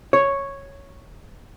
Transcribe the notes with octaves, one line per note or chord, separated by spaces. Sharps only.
C#5